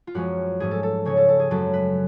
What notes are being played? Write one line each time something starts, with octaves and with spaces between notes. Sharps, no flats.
F4
F#2 F3 G#3 C#4 F#4
G#2 F3 A3 C#4 G#4
A4
A4
C#3 G#3 C#4 C#5
A4
A4
G#4
F#2 C#3 F#3 A3 C#4 A4
B4